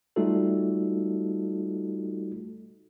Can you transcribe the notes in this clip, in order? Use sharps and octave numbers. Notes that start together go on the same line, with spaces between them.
G3 A3 D#4 F4 F#4 A4